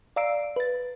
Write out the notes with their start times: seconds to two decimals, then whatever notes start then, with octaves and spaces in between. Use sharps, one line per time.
0.16 D5 F5 A#5 E6 C7 D7
0.56 B4 A6